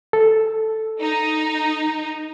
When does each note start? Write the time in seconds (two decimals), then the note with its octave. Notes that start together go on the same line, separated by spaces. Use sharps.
0.13 A4
1.00 D#4